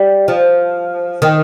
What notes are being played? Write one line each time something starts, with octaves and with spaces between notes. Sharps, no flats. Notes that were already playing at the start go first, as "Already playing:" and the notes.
Already playing: G3
F3
D#3